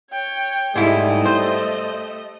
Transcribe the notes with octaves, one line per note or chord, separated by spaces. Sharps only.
C#5 G5
G#2 G3 A3 E4 D#5
C5